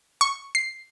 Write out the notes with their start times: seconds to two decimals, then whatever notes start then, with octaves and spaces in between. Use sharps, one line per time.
0.21 C#6
0.55 C7